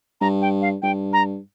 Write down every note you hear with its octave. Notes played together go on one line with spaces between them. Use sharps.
G2 A#5
G5
F5
G2 G5
A#5